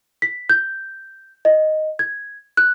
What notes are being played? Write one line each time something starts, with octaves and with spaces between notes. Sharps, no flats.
B6
G6
D#5
G#6
F#6